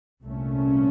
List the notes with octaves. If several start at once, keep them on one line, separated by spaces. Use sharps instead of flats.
C2 A#2 A3 C#4